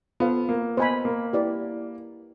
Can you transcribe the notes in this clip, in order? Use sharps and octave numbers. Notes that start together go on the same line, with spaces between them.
B3 F4 A4 C5 F5
A#3
B3 C5 D#5 G#5 B5
A#3
E4 G4 B4 D5